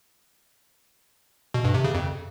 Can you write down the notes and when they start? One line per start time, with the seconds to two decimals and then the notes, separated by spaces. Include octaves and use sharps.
1.54 B2
1.64 G2
1.74 C3
1.84 C#3
1.94 F2